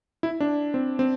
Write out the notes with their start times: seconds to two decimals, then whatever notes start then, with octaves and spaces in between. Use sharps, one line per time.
0.23 E4
0.40 D4
0.74 C4
0.99 C4